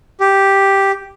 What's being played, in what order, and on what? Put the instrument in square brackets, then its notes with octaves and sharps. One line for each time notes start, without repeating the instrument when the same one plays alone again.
[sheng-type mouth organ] G4